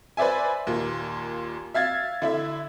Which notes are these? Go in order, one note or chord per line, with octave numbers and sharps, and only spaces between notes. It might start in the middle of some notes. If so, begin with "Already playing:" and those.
B4 C5 D5 E5 G#5
D#2 A#2
E5 F5 G#6 A6
D3 E4 E5